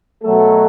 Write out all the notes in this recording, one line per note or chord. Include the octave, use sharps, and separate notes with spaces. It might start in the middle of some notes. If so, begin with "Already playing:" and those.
B2 F#3 A3 A4